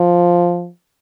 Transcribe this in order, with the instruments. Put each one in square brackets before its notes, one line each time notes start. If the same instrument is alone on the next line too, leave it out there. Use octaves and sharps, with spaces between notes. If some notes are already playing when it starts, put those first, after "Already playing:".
Already playing: [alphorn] F3